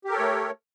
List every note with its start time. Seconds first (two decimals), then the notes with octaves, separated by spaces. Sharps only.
0.05 G4
0.08 A#4
0.12 A4
0.16 C#5
0.19 A3